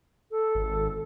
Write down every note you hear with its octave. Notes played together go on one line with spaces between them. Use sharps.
A4
G#1